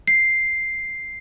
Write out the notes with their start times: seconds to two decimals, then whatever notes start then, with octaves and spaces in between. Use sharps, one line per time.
0.08 C7